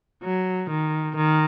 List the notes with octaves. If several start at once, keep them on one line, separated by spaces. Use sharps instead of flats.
F#3
D#3
D#3